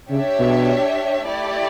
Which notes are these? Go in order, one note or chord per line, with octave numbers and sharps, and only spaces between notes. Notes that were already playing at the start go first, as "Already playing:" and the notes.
C#3 D4 G4 C#5 E5
B2
A3 E4 G4 D5